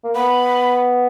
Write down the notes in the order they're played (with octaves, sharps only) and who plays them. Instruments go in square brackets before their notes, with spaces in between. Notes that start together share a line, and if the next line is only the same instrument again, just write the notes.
[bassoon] A#3
[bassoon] B3 [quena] B5